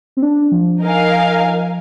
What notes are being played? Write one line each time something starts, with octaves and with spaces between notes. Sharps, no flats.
C4
D4
F3
D#4 A#4 F5 G#5